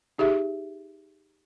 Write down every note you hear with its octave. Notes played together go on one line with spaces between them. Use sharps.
D#4 G4 G#4 E5